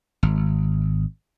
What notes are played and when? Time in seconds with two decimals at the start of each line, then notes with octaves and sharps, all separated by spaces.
0.23 G#1